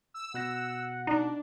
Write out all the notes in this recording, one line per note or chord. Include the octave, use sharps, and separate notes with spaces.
E6
B2 F#5 F#6 A#6
D4 D#4